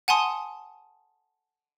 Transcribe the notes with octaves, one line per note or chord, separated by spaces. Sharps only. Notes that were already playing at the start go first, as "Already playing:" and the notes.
F#5 G#5 A5 C6 D#6